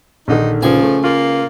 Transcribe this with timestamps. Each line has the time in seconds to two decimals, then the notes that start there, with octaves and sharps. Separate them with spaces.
0.28 A#1 D3 D#3 D#4
0.62 C#2 F3 G#5
0.82 A3
1.04 A#3 F4